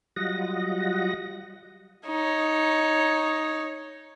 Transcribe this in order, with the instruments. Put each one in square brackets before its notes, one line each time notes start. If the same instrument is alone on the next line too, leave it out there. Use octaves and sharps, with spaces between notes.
[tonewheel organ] F#3 G3 F4 D#5 F#5 A#6
[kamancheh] D#4 C#5